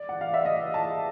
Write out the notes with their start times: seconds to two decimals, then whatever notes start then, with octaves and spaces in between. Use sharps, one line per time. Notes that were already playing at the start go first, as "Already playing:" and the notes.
Already playing: D5
0.09 F#5
0.21 F5
0.34 E5
0.45 D#5
0.74 A5